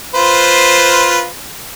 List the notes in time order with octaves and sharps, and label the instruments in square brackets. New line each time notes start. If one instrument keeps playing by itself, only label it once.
[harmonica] F4 B4 C5